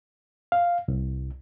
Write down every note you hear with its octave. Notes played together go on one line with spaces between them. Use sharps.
F5
C2